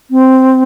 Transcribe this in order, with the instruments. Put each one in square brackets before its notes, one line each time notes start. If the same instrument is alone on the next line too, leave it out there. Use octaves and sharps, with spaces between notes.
[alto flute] C4